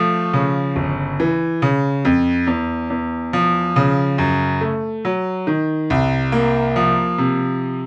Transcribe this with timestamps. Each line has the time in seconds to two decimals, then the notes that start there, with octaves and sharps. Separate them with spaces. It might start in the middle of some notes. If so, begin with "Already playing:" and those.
Already playing: F3 A3
0.33 C#3
0.76 G1
1.20 E3
1.62 C#3
2.05 F2
2.47 E2
2.90 E2
3.33 F3
3.76 C#3
4.18 F#2
4.61 A3
5.05 F#3
5.47 D#3
5.90 C2
6.32 A#3
6.76 F3
7.18 C3